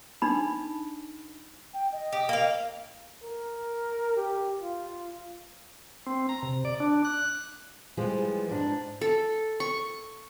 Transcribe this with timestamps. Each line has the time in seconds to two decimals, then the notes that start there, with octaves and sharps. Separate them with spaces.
0.22 D4 D#4 B5
1.74 G5
1.92 D#5
2.13 G4
2.29 A#3 F5
3.24 A#4
4.16 G4
4.61 F4
6.06 C4
6.29 A#5
6.43 C3
6.65 D5
6.80 D4
7.05 F#6
7.97 E3 F3 G3 G#3
8.49 G#2 D4
9.01 A4
9.60 C#6